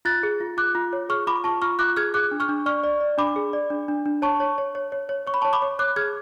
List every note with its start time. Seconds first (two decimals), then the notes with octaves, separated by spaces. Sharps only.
0.05 F4 F#6 A6
0.23 G#4
0.40 F4
0.57 F4 D6 F#6
0.75 F4
0.93 C#5
1.09 G#4 C#6 F6
1.27 F4 B5 D6
1.44 F4 A5 C#6
1.62 F4 C#6 F6
1.79 F4 D6 F#6
1.97 G#4 F6 G#6
2.14 G#4 D6 F#6
2.31 D4
2.40 C#6 F6
2.49 D4
2.66 D5 C#6 F6
2.84 D5
3.01 D5
3.18 D4 B5 D6
3.36 G#4
3.53 D5
3.70 D4
3.88 D4
4.06 D4
4.22 C#5 A5 C#6
4.40 C#5
4.58 C#5
4.75 C#5
4.92 C#5
5.09 C#5
5.27 C#5 C#6
5.34 B5
5.42 A5 C#6
5.45 C#5
5.53 B5 D6
5.62 C#5
5.79 C#5 D6 F#6
5.96 G#4 F6 G#6